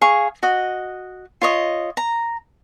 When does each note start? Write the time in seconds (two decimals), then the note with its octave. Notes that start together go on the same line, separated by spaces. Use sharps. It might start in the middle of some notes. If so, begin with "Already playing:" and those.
0.02 G#4 F5 C#6
0.43 F#4 D#5
1.42 F4 C#5 D#5
1.97 A#5